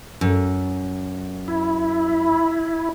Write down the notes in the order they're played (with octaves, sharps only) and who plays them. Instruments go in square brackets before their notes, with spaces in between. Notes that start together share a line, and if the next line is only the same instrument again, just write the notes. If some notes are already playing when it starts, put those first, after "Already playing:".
[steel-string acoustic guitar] F#2
[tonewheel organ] E4